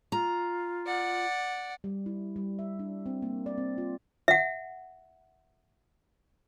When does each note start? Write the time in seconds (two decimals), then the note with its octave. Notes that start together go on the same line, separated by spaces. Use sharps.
0.12 F4 A#5
0.87 D5 F#5
1.84 G3
2.06 E4
2.36 G3
2.59 E5
2.79 D4
3.06 C4
3.22 A#3
3.46 D5
3.58 C4
3.78 F4
4.28 E5 F#5